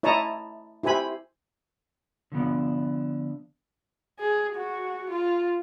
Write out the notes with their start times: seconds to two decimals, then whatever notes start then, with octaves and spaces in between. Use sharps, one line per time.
0.03 E4 C#5 D#5 A5 A#5
0.83 E4 G4 C5 G#5 B5
2.32 D3 F3 B3 D4
4.19 G#4
4.55 F#4
5.10 F4